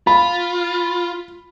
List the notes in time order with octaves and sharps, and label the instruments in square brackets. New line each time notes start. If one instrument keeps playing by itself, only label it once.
[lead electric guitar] F4 [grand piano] B5